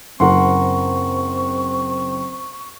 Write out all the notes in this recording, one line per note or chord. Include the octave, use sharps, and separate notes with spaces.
F#1 C4 A#4 F#5 C6 C#6